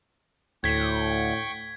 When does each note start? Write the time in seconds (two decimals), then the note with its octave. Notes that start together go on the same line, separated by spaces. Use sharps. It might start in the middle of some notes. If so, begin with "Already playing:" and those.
0.64 D2 A2 G5 C#6 G6 G#6 B6